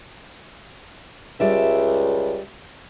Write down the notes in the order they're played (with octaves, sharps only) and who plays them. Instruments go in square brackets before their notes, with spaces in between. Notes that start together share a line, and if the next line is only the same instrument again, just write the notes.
[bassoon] C#2 [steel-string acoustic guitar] G3 D5 E5